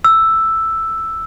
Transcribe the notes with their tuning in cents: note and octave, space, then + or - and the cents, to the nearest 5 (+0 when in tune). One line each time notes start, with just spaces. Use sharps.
E6 +0